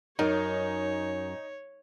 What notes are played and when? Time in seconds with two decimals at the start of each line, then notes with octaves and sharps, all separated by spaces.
0.19 F#2 D#4 C#5